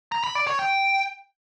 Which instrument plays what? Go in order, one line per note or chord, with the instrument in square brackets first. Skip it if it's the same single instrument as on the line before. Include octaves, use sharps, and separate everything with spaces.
[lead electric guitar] A#5
B5
D5
C#5
G5